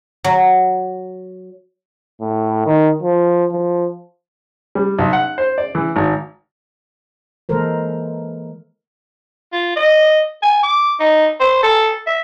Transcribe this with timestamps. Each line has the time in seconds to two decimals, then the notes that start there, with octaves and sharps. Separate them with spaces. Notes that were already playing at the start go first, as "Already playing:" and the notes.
0.24 F#3
2.21 A2
2.66 D#3
3.03 F3
3.53 F3
4.75 G3
4.99 B1
5.13 F#5
5.38 C5
5.58 D5
5.75 E3
5.96 G#1
7.49 E3 G#3 A#3 A4 A#4 C5
9.53 F4
9.76 D#5
10.43 G#5
10.63 D6
11.00 D#4
11.41 C5
11.63 A4
12.07 E5